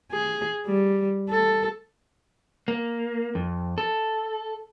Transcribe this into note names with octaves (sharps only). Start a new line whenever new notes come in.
G#4
G3
A4
A#3
F2
A4